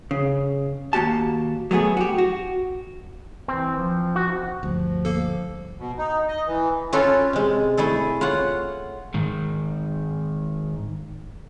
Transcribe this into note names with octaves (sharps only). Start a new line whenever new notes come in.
C#3
D#2 A#3 F#4 G4 A5
F#3 A3 B3 G#4
F#4 G4
F#4
E3 C4
F3
F#4
D2 G2 F3
A#3 A4
B2
D#4
D#5
E3
C#4 F4 A4 B4 C#5
C3 G#3
A3 E4 G#4 A4
F4 C#5 F#5
G#2 D#3